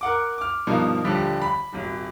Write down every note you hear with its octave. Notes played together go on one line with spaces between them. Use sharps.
A#4 F#5 D6
D6 F6
G2 B2 F3 A#3 D#4
D#1 D3 F3 G3 G4
B5
D#1 G#1